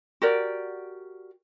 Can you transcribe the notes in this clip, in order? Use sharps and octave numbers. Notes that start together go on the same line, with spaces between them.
F#4 G4 A#4 D5